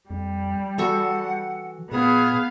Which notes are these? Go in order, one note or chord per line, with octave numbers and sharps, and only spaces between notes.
F2 G3
E3 F#4 A4 F#5 C#6
A#2 B3 G#4 F5